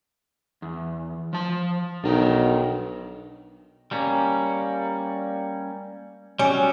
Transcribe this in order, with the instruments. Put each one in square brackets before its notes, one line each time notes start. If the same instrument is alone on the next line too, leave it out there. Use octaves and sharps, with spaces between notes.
[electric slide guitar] E2
F3 A5
[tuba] B1 [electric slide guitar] D4 A#4 G5
[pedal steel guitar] G3 A#3 C#4
[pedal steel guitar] F#3 G3 [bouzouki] C#4